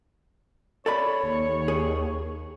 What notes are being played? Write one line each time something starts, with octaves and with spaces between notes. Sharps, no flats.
A4 C#5 D5 B5
D#2
G#4